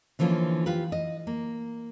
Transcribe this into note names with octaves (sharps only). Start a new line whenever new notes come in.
D3 E3 F3 A#3 C#4
F4 G4 B4
D#5
A#3